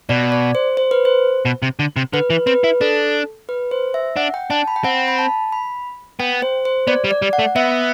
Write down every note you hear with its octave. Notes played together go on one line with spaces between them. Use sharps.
B2 D5
D5
C5
C5
B4
C5
B2
C3
D3
C3
D3 B4
E3
C4 B4
E4
D4 A4
B4
C5
E5
D4 F#5
G5
D4 A5
B5
G5
C4 F#5
B5
A5
B5
B3 G5
C5
C5
B3 D5
G3
D5
G3
F#5
A3
B3 E5